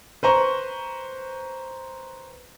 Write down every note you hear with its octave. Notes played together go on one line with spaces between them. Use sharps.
B4 C5 A#5 C#6